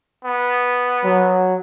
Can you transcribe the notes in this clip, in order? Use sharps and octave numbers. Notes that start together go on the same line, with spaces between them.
B3
F#3